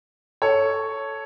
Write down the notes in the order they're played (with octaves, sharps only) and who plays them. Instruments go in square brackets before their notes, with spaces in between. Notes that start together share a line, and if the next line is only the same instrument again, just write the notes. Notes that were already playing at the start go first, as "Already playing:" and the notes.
[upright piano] A4 C#5